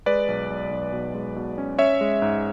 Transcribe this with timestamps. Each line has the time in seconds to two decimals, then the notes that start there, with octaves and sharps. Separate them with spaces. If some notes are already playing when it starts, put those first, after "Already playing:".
0.06 G#3 B4 D5
0.28 B1
0.50 B1
0.71 B1
0.93 B2
1.14 G#3
1.36 B2
1.58 C#4
1.78 C#4 C#5 E5
2.01 G#3
2.22 G#2